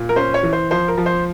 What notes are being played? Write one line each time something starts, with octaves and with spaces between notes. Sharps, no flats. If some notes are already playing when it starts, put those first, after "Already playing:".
Already playing: A#2
A#4
C#4 C5
C#5
E3
C5
F3 C5
A#4
F3
C5